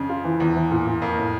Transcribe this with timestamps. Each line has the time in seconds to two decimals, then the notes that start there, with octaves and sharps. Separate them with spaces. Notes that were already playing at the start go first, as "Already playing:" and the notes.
Already playing: F2 C#3
0.09 F4
0.24 E3
0.40 E2 E3
0.55 E3
0.71 A#2
0.86 A#2
1.02 F2 A#3
1.17 A2